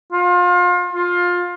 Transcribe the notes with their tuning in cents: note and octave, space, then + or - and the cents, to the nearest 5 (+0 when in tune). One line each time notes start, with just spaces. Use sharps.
F4 +30
F4 +20